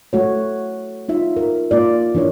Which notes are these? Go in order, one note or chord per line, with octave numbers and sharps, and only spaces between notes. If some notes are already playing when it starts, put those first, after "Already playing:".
A3 F#4 C#5
D#4 F4 E5
A#4
A#3 F4 D5
E3 D4 A#4 C#5